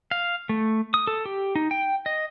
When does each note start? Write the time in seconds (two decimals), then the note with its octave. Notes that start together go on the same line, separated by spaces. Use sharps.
0.11 F5
0.49 A3
0.94 D#6
1.07 A4
1.26 G4
1.56 D#4
1.71 G5
2.06 D#5